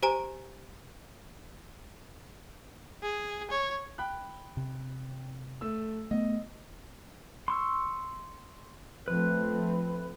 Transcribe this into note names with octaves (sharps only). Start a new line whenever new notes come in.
G4 C5 G#5 A#5 D7
G#4
C#5
G5 B5 F#6
C3
A3 E6
A3 B3 D#5
C6 C#6 E6
F3 A3 C4 B4